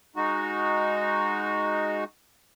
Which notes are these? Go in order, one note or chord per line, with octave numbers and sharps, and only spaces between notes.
G#3 D#4 F#4